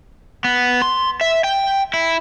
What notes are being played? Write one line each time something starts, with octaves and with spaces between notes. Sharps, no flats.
B3
C6
E5
G5
E4